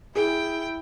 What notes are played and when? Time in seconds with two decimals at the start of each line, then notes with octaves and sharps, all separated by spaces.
0.16 E4 G#4 G5